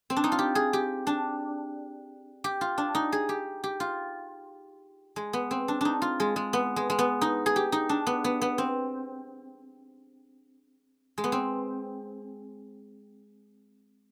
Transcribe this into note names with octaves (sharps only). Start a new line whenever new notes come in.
C4
D4
D#4
F4
G4
G#4
G4
D4
G4
F4
D4
D#4
G#4
G4
G4
F4
G#3
B3
C4
D4
D4 D#4
F4
G#3
G#3
B3
G#3
G#3
B3
D#4
G#4
G4
D#4
D4
B3
B3
B3
C4
G#3
B3
C4